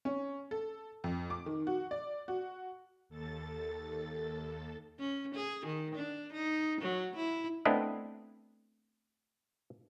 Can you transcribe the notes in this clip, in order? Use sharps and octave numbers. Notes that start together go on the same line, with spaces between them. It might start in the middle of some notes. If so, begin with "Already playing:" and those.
C#4
A4
F2
D6
D#3
F#4
D5
F#4
D#2 A4 A6
C#4
G#4
D#3
D4
D#4
F#3
E4
A3 B3 C4 D4 E4 D#5